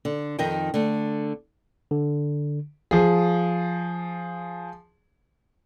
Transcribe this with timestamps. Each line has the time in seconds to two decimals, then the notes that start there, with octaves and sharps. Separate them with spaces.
0.05 D3
0.39 F2 D#3 A#4 D#5 G5
0.74 D3 A3
1.91 D3
2.91 F3 G#4